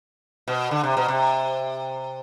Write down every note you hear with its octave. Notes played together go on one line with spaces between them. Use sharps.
B2
D3
C3
B2
C3